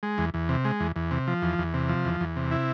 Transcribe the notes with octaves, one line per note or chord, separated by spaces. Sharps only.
G#3
E2
E2
C3
G#3
E2
E2
C3
F3
E2
E2
C3
F3
E2
E2
C3
E4